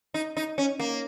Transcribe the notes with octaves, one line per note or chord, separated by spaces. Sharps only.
D#4
D#4
C#4
A#3